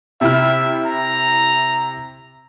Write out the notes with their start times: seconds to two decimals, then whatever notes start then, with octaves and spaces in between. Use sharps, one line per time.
0.21 C3 E4 E5 F6
0.86 A#5